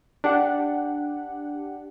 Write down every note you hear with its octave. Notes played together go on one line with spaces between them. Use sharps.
D4 G4 F#5